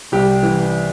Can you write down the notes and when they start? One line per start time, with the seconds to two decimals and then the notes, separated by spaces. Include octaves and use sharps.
0.12 C2 G4
0.43 E3